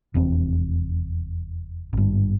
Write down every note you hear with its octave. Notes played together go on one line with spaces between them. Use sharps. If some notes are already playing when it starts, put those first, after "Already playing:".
F1 E2 C4
G#1 G2